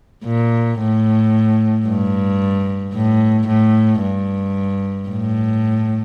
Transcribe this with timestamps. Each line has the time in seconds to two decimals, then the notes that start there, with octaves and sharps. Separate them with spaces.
0.25 A#2
0.80 A2
1.86 G2
2.94 A2
3.48 A2
4.02 G2
5.09 A2